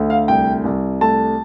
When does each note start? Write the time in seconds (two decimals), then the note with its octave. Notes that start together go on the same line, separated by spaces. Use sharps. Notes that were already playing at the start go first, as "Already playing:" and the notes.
Already playing: D2 D3
0.10 F5
0.28 C2 G5
0.64 C2
1.01 A3 A5